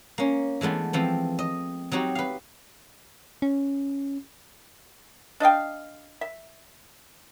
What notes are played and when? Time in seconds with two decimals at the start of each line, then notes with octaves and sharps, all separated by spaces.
0.18 A#3 C#4
0.61 E3 G#3 A3 B3 D4
0.93 E3 F3 C4
1.39 D#5
1.92 F#3 C4 D#4 F#4 G4
2.15 B4 F5
3.42 C#4
5.40 D4 D#5 F5 G5
6.21 E5